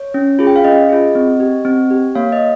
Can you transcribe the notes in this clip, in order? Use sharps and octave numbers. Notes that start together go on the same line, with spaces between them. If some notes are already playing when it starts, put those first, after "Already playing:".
Already playing: C#5
C#4
F4 G#4
G5
F5
C#4 D#5
F4 G#4
C4
G4
C4
G4
A#3 C#5 F5
D#5